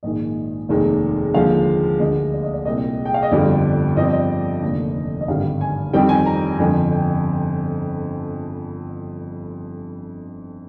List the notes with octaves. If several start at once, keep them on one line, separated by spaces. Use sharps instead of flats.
A#1 G#2 D#3 A#3 D#5
F1 D#2 D#3 G#3
D#2 D3 F3 G#3 F5
D2 D3 G#3 D#5
D5
D#5
D5
C2 A#2 G#3 C4 D#5
G5
F5
D#5
G1 F2 D3 G3 D5
G2 F3 C4 D#5
D5
D#5
F1 D#2 D3
D#5
G#1 G2 D3 G3 F5
G#5
F2 D#3 G3 C4 G5
G#5
A#5
G1 F2 D3 F3 G#5
G5